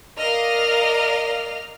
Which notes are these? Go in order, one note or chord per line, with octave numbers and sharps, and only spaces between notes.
A#4 D5 D#5 F5 F6